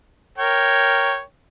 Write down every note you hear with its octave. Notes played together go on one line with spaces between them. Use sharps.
A#4 C#5 G5